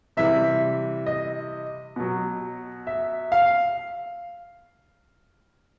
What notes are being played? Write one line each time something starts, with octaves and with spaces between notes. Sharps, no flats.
C3 E3 G3 E5
D#5
B2 F#3
E5
F5